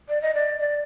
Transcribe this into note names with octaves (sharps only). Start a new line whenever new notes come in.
D5
D#5
D5
D5